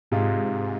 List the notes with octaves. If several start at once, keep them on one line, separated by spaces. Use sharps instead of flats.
G#2 C3 G#3 F4